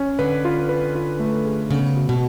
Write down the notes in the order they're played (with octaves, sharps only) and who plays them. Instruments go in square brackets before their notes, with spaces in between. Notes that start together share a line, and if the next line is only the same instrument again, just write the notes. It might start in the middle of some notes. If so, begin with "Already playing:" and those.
Already playing: [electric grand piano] C#4
[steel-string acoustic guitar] D3 [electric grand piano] B4
[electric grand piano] F4
B4
F4
A3
G#4
[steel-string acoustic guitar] C#3 [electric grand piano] B3
[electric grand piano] F#4
[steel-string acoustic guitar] B2